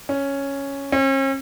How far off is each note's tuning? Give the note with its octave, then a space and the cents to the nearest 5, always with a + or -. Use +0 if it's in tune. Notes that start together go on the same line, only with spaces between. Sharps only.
C#4 +0
C#4 -45